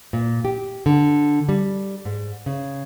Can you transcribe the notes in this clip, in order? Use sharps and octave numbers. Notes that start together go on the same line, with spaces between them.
A#2
G4
D3
G3
G#2
C#3